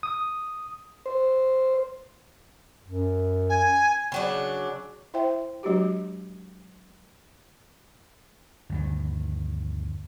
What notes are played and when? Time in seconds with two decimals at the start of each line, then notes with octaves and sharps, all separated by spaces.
0.03 D#6
1.06 C5
2.85 F#2
3.50 G#5
4.12 C#3 F#3 D4
5.14 E4 C5 E5 G5
5.63 F#3 G#3 D4 F#4 G4
8.69 D2 G2 D#3